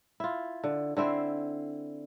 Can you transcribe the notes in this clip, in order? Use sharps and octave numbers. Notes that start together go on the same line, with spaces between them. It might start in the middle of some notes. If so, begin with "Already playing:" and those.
E4 F4
D3
D3 C4 E4 C5